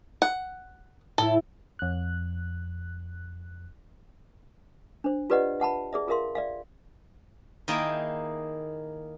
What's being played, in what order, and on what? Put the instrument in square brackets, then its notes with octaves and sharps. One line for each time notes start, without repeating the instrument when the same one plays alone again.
[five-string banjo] F#5
[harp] A2 E4 [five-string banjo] A4
[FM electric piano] F2 F#6
[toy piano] D4 C5
F4 G4 B4 D5 D#5 F#5
E5 F#5 A5 B5
G#4 D5 E5
F4 G#4 A#4 E5 F5 C6
D5 E5 F5
[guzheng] D#3 A#3 D#4 E4 G#4 G5